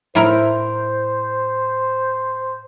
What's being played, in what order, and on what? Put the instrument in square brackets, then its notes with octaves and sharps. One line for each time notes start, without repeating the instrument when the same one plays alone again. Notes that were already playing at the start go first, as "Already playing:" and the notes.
[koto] A2 E4 A#4 [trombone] C5